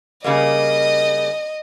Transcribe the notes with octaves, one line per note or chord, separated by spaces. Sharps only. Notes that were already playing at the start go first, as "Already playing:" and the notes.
C#3 G3 A#3 D#5